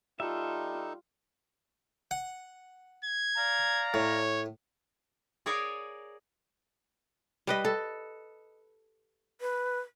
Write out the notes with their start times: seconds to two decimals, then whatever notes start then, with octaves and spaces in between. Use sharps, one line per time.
0.20 G3 D#4 F4 A4 E5
2.11 F#5
3.04 G#6
3.37 D5 F5 A#5
3.94 A2 C#5
5.46 G#4 A#4 C#5 D5 F5 G#5
7.47 G3 B4 D#5
7.65 A4
9.41 B4